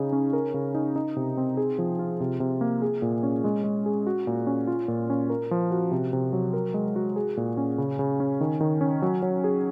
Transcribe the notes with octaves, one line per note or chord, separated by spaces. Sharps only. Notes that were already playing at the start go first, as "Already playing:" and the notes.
Already playing: C#3 D#4 G#4
C#4
A#4
C#3
D#4
D#4
C3
C4
G#4
F3
F4
C3
C3
A#3
G#4
A#2
C#4
G#3
G#3
G#4
F#4
A#2
C#4
F4
A#2
C#4
A#4
F3
F#4
C3
C3
F#3
A#4
G#3
F#4
G#4
A#2
C#4
C#3
C#3
C#4
D#3
D#3
C#4
F#3
F#3
G#4